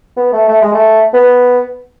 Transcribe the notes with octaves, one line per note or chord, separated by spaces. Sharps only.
B3
A3
A3
G#3
A3
B3